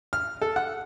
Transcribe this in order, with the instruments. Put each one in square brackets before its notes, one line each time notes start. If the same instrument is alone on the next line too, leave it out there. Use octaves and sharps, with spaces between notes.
[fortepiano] F6
A4
F#5